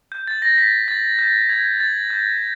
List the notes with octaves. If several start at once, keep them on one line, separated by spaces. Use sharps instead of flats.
G6
A6
A#6
B6
A6
G6
G#6
A6
G6